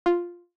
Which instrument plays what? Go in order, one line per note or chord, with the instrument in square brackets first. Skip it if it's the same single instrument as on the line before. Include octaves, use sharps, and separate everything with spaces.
[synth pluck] F4